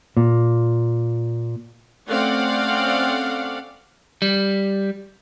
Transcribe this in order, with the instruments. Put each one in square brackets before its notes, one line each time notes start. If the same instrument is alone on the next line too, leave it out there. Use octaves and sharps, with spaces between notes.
[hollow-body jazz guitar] A#2
[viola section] A3 C4 C#4 D5 F5 F#5
[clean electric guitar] G3